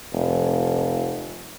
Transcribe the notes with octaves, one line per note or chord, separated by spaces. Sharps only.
F1